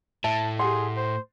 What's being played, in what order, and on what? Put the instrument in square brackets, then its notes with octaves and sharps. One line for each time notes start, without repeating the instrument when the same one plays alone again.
[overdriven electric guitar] A2 [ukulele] E5 [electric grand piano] A5
[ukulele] G4 F#5 [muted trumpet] G#4 [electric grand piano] C6
[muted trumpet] C5